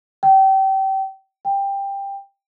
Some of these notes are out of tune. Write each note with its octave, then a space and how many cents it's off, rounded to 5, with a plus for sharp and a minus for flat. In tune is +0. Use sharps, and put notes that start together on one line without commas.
G5 -30
G5 +15